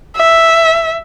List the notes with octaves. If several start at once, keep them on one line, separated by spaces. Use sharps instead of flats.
E5